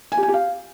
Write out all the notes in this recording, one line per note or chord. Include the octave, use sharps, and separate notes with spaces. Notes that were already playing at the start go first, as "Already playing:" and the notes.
G#5
G4
G#5
G4
F5